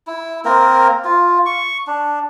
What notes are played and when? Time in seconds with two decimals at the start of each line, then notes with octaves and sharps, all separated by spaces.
0.07 E4
0.45 A#3 C4 A#4
1.04 F4
1.46 C#6
1.87 D4